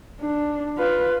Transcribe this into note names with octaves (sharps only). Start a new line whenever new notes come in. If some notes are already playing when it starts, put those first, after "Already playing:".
D4
F4 B4